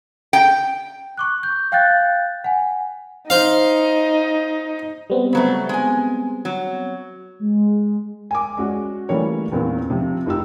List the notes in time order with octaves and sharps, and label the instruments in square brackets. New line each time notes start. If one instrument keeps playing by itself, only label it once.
[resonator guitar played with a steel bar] G5
[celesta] C#6 D6 F#6
G6
F5 G5 F#6 G6 A6
F#5 G#5
[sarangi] D#4 [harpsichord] C5 F5
[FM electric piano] G3 B3 C4
[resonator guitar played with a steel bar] C#3 F#3 A3
G#3 G#5
F#3
[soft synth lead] G#3
[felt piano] G#5 D6
G#3 C#4 F#4 D5
E3 G3 A3 A#3 C#4 C#5
E2 A#2 A#3 C4 C#4
C3 F3 C4
F1 D#4 F4 G4 E6